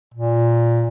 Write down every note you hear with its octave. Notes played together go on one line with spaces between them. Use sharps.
A#2